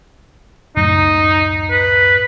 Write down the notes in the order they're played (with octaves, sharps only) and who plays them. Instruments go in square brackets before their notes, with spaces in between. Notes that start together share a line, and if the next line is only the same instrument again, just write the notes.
[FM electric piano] C#2 F#2 A2 [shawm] D#4
[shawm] B4